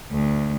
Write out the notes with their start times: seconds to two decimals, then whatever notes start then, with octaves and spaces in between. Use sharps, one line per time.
0.12 D2